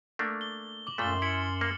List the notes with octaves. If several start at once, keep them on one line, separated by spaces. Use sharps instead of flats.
A3 A#3 D4
G7
D6 F#7
F#2 A#2 A3 C6 F6 A6 G7
E4 C#7 F#7
A#3 F6